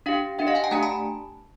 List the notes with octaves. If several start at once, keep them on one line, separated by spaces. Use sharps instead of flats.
D4 G4 F5 G5
D4 G4 E5 F#5
D#5 F5
F#5 G#5
G5 A5
A3 D4 G4 G#5 A#5
A5 B5